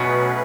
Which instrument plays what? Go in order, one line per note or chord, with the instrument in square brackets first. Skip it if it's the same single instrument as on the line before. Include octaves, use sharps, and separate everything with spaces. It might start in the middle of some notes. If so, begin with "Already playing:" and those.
Already playing: [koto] B2 [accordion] F#3 A3 C#4 G#4 B4